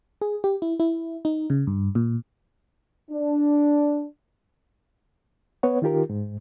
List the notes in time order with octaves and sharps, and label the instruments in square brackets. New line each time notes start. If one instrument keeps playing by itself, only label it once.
[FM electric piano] G#4
G4
E4
E4
D#4
C#3
G2
A#2
[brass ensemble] D4
[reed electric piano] B3 B4 C#5 F#5
D#3 D#4 F4 G4 A#4
G#2